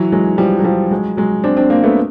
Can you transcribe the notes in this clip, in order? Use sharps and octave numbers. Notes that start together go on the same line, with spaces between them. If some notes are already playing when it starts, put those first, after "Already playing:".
Already playing: E3 F#3
F#3 G#3
F3 G3
F#3
F3 G3
F#3 G#3
F#3 G#3
C4 D4
C4 D4
A#3 C4
A3 B3